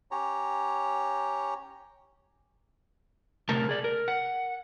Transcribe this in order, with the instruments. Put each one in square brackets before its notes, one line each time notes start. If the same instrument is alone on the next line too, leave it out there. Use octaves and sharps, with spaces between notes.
[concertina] C#4 G4 C#5 A#5
[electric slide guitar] C3 A3 A#4 A5
G#4 D5
A#4
F#5